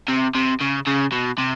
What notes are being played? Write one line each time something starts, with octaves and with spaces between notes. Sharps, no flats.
C3
C3
C#3
C#3
B2
C3